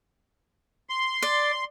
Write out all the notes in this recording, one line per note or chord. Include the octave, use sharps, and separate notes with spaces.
C6
D5